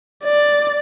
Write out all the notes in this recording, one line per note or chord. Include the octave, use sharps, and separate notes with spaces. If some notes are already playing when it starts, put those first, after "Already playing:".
D5